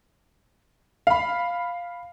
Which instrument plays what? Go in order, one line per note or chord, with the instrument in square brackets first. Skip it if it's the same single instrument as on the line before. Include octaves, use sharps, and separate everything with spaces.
[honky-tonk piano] F5 B5